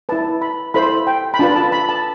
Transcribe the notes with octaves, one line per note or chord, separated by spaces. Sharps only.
E4 B4 A5
B5
E4 A4 C5 B5
G5
B5
D4 F4 B4 A5
A5
B5
A5